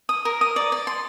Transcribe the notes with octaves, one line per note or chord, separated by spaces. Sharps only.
D#6
A#4
D#6
D5
D5
C6